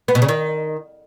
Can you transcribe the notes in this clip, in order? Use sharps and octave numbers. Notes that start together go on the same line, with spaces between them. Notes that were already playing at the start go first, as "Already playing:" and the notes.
B3
B2
C#3
D#3